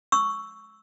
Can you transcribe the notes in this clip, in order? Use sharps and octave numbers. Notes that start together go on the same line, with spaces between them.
C#6 E6